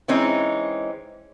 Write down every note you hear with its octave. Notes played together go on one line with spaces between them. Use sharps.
E3 G#3 C4 C#4 D#4